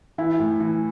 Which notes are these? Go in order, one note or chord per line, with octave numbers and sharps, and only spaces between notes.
E3 E4
A2
E3